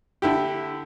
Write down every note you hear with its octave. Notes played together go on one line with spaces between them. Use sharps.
D3 E4 G4